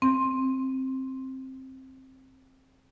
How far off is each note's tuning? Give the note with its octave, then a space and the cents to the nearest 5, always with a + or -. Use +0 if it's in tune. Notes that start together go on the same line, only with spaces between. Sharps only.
C4 +10